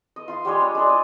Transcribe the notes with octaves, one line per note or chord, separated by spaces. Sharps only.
D#5
F4 C6
G3 G#3 C#5 D#5
D4
G#3 D4 G#4
D5 D#5